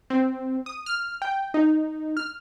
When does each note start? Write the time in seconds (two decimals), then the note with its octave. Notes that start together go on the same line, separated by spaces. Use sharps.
0.10 C4
0.66 D#6
0.86 F6
1.22 G5
1.54 D#4
2.17 F6